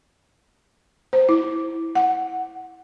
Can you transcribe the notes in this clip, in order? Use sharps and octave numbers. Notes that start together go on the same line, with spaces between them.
C5
E4
F#5